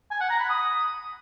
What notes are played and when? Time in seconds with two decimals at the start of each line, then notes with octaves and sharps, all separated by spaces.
0.11 G#5
0.21 F#5
0.30 A#5
0.40 B5
0.50 D#6